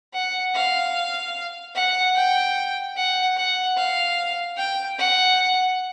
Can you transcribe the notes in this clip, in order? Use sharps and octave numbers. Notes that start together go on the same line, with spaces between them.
F#5
F5
F#5
G5
F#5
F#5
F5
G5
F#5